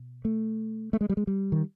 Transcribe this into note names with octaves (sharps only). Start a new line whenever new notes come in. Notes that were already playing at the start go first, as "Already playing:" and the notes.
Already playing: B2
A3
A3
G#3
G3
G#3
G3
D#3